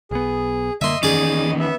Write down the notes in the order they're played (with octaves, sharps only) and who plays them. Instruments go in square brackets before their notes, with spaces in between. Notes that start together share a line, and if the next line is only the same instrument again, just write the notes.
[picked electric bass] B1 B3 [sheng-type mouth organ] G#4
[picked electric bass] D3 A#3 [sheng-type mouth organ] D#5 [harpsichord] E5 C6
[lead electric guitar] E2 D#3 [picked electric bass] C#4 [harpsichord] G#4 D5
[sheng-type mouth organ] B3 E5